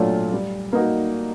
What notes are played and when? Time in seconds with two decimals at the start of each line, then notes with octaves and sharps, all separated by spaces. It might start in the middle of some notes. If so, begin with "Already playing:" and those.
Already playing: A#2 F#3 A3 D4 F4
0.32 G3
0.73 A#3 D#4 F#4